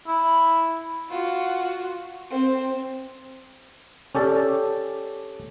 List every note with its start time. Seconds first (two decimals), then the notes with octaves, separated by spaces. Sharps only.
0.07 E4
1.09 F4 F#4
2.30 C4
4.15 C#4 G4 A4 D5